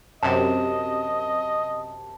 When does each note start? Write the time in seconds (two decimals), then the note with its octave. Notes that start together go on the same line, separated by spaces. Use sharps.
0.23 F#2 C3 D#5 A5